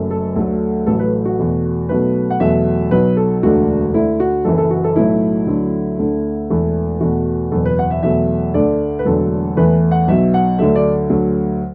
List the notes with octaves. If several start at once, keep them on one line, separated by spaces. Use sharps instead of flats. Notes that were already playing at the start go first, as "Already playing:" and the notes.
Already playing: F#1 F#2 F#3 A3
A4
D2 D3 F#3 A3 A4
A1 A2 F#3 A3 A4
B4
F#4
E2 B2 A3
B1 B2 F#3 A3 B4
F#5
E2 B2 F#3 A3 E5
B1 B2 F#3 B4
A4
E1 D2 D3 A3 F#4
D2 D3 A3 E4
F#4
F#1 F#2 E3 A4
A4
F#4
A4
B1 A2 F#3 A3 E4
D2 D3 F#3 A3
D2 D3 A3
E1 E2 E3 A3
E2 B2 A3 F#4
F#1 E2 B2 A4
B4
F#5
E5
E2 B2 F#3 A3 E5
D2 D3 A3 D5
B4
E1 E2 D3 F#3 A3 A4
E2 E3 A3 B4
F#5
B1 B2 F#3 E5
F#5
D2 D3 F#3 A3 E5
D5
D2 D3 F#3 A3